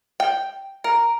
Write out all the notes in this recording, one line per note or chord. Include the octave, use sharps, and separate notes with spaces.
G5
A#4